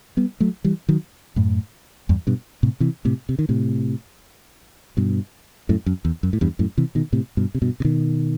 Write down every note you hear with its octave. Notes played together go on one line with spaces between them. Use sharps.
G3 B3
F#3 A3
E3 G3
D#3 F#3
F#2 A2
E2 G2
G2 B2
A2 C3
C3 E3
A2 C3
C3
D#3
A2 C3
G2 B2
F#2 A2
F#2
E2
F#2
A2
E2 G2
F#2 A2
C3 E3
B2 D#3
A2 C3
G2 B2
C3
G2 B2
C3
B2 D#3